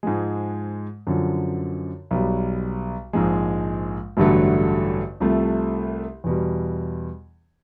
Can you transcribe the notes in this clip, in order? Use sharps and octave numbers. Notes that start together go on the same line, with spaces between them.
G#2 F3 G#3
F#2 D3 F3
B1 B2 G3
A#1 G#2 F3 G#3
A1 G2 D3 F#3 A3
C2 C3 F3 A3
E2 B2 G3